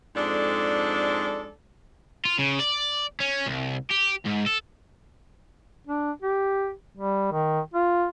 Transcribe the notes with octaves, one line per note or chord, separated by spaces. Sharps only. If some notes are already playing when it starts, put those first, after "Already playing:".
F2 G#2 G#3 D4 A4 D5
F4
C#3
D5
C#4
C2
G4
G#2
A4
D4
G4
G3
D#3
F4